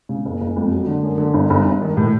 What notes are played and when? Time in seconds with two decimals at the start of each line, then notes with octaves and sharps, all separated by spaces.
0.09 C#3
0.25 F#1
0.41 F#1
0.56 F2
0.71 F#3
0.87 D3
1.03 F#2
1.18 D3
1.34 G1
1.50 G1
1.65 G1
1.81 D#3
1.97 A2